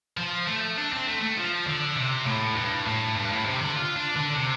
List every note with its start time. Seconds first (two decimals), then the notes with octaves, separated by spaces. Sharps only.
0.17 F3
0.47 A3
0.78 D4
0.92 C4
1.08 A3
1.22 A3
1.38 F3
1.67 D3
1.96 C3
2.26 A2
2.56 G2
2.87 A2
3.16 G2
3.31 A2
3.46 C3
3.60 D3
3.75 F4
3.96 D4
4.16 D3
4.35 C3